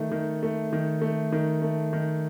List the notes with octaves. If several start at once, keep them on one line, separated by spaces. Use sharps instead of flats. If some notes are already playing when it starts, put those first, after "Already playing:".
Already playing: D#3 A3
D#3
A3
D#3
A3
D#3
A3
D#3